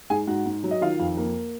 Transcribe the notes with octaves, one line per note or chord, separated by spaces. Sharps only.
G#2 G#4 G#5
G#2 F#4 F#5
G#2
F#3
D#5
D#3 F4 F5
F2
A#3